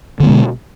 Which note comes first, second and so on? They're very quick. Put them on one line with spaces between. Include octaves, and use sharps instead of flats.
D3 B3 G#3 B2